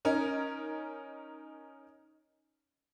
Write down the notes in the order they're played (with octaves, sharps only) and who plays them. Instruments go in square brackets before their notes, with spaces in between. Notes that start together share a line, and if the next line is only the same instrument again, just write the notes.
[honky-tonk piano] C#4 D#4 A#4